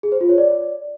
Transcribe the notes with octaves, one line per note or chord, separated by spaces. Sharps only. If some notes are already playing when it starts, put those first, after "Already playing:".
G#4
C5
F4
C#5
D5